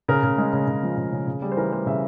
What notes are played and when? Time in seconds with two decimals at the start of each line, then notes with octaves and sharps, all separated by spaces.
0.08 C#3 A#4
0.23 C#3
0.38 G#3
0.53 C#3
0.68 C#3
0.83 F3
0.97 C#3
1.13 C#3
1.27 C#3
1.42 G3 G#4
1.52 C5
1.57 E3 A#4
1.72 G3 C5
1.86 C#3 E5